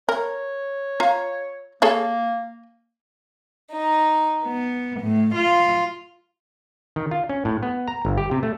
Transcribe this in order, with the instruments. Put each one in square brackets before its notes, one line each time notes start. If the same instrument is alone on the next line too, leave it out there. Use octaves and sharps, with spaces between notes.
[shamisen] A#4 [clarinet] C#5
[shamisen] F4 F5 A#5
[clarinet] A#3 [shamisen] G#4 A4 C#5
[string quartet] D#4
B3
A2
F4
[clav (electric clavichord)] D#3
F4
C#4
A2
B3
A#5
G1
G4
C3
A3